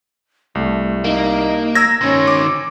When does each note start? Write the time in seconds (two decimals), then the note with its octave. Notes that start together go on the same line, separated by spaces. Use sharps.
0.55 C2 A3
1.04 A#3 D#4
1.75 A#5 E6 G#6 A#6
2.02 D#3 C#4 C5
2.27 D6